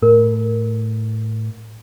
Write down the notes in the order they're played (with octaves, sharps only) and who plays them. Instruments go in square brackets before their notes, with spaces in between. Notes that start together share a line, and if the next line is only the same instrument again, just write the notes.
[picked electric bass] A2 [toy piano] A#4